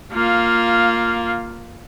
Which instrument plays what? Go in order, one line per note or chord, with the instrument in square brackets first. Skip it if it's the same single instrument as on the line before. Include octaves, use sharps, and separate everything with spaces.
[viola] A#3 F4